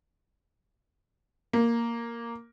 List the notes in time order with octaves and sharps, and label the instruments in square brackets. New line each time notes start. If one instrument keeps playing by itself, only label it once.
[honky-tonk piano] A#3